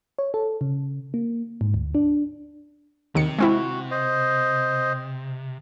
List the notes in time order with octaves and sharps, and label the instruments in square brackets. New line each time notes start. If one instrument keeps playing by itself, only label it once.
[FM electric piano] C#5
A4
C#3
A#3
G#2
D2
D4
[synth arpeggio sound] D#2 D#3 C#7 [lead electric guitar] C3
[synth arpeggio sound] G#3 C4 E4 [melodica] F#4
[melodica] C5 D#5